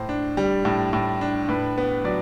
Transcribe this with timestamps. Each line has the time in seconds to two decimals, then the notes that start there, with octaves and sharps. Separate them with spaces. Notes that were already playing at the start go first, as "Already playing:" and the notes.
Already playing: A2 C5
0.09 D4
0.37 G3
0.65 A2
0.93 A2
1.21 D4
1.49 A2 B4
1.78 B3
2.05 F#3 D5